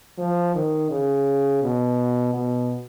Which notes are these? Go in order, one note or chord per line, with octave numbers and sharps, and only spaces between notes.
F3
D#3
C#3
B2
B2